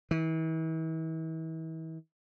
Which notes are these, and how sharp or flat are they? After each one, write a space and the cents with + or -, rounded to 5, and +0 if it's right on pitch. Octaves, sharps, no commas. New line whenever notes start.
E3 -40